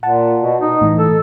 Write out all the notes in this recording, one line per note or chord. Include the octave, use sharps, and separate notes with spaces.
A#2 F#5 A5
B2
D#4
A2 E3
A4